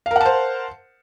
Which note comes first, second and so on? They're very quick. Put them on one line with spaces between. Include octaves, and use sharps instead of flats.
F5 A#4 F#5 A5 C5